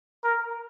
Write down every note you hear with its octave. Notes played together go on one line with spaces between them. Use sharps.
A#4